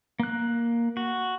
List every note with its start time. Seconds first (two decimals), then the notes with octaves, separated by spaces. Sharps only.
0.19 A#3 F#6
0.97 F#4